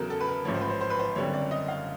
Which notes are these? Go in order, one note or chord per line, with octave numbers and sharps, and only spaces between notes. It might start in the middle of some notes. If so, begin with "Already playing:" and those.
Already playing: E2 C#3 F#3 A4 A#4
A4
B4
A#4
A1 G#2 F3 C#5
C5
B4
C5
C5
B4
C5
F#1 F#2 D3 G3 C4 C#5
D5
D#5
F5